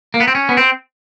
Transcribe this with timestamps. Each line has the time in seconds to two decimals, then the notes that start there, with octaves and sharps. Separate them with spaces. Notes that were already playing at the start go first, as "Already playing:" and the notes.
0.14 A#3
0.20 B3
0.28 C4
0.35 C#4
0.49 B3
0.57 C4